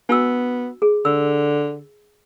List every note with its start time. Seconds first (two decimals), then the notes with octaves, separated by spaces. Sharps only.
0.09 B3 D4 F#4 E6
0.82 G#4
1.05 D3 E6